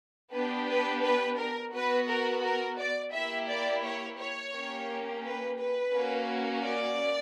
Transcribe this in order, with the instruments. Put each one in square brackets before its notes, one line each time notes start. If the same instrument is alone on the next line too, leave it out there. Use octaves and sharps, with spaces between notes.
[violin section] B3 D4 G4 B4
B4
B4
A#4
B3 F#4 B4
A#4
A#4
D5
A#3 E4 G4 E5
D5
C#5
C#5
A#3 C#4 G4
B4
B4
A#3 C#4 F#4
D5